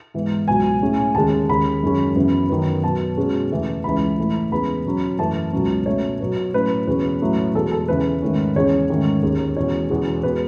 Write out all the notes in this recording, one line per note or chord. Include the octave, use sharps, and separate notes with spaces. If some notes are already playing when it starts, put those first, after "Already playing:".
G#2 E3 B3
C#2 B2 F#3 G#5
A2 G#3 C#4
D#2 C#3 G#3 C#4 A5
D#2 C#3 G#3 B5
F#2 D#3 G#3 C#4
F#2 C#3 E3 B3
F#2 D#3 F#3 B3
B2 F#3 B3 A5
B2 G#3 C#4
E2 C#3 E3 A3
C#2 C#3 E3 B5
A2 E3 A3
E2 C#3 G#3 B3 B5
B2 F#3 C#4
F#2 E3 A3 A5
C#2 B2 F#3 C#4
B2 A3 C#4 C#5
B2 F#3 B3
A2 F#3 C#4 B4
E2 B2 G#3 C#4 B4
A2 F#3 A3 C#4
E2 B2 G#3 A4
A4
E2 C#3 E3 B3 B4
G#2 D#3 A3 C#4
E2 C#3 G#3 C#4 C#5
G#2 D#3 A3 C#4
D#2 D#3 G#3 C#4
E2 B2 G#3 C#4 C#5
E2 B2 G#3 C#4
B2 G#3 B3 B4